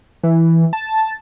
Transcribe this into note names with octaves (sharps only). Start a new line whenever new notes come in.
E3
A5